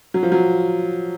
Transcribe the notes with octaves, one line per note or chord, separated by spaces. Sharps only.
F#3
F3
F#3